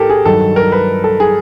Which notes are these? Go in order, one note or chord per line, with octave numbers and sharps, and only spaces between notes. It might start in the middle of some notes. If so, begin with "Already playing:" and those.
Already playing: A2 G4 A4 A#4
G#4
G2 D#3 F#3 A4
A#4
B4
A4
G#4